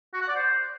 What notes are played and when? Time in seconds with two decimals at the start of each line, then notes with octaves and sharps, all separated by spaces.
0.14 F#4
0.21 F#5
0.28 D5
0.36 C5